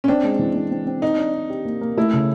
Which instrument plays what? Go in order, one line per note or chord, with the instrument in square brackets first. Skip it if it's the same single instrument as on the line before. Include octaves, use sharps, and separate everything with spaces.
[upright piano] C#4
[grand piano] C4 [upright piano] D4
[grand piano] G#3
E3
C4
C4
C4
[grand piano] D4 [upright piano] D#4
[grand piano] D4
D4
G4
A#3
A#3
[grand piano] A3 [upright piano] E4
[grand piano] C#3